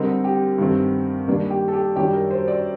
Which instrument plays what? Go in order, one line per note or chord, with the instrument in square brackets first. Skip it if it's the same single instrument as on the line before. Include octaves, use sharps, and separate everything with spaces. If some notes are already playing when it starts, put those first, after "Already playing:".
Already playing: [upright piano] D3 G3 C4 D#4 [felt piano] A#4
[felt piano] G4
[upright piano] G2 D#3 A3 C4
D#3 G3 A#3 D4
[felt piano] G4
A4
G4
[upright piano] F#2 D#3 G3 D4 [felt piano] G4
[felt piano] A#4
C5
D5